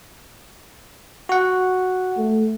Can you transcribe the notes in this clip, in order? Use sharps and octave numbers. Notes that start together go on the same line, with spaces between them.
F#4 F#5
A3